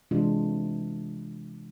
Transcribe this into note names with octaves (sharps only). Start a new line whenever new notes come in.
C3 E3 G#3 D4 F4